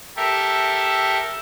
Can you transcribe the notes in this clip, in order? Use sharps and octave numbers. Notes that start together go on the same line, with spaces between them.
G4 A4 A#4 E5